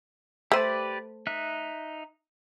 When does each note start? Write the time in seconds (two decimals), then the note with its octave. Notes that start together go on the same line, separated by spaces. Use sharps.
0.52 A3 G4 B4 C5 D5
1.27 D#4 E5 F#6